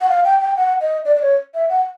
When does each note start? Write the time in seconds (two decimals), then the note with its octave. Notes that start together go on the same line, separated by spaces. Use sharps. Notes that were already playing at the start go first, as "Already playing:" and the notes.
0.01 F#5
0.09 F5
0.25 G5
0.40 G5
0.56 F#5
0.81 D#5
1.05 D5
1.16 D5
1.22 C#5
1.54 E5
1.69 F#5